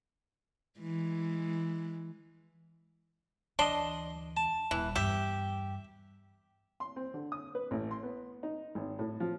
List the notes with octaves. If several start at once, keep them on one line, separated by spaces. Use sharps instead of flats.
E3 G#3
D2 E3 D4 D#5 C6
A5
D#1 E3
E2 G2 G4 E5
C6
C4
D3
D#6
B4
A1
C6
B3
D#4
G#1
A2
F3